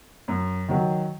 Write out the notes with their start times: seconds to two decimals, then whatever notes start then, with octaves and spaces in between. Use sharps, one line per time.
0.28 F#2
0.68 D#3 F#3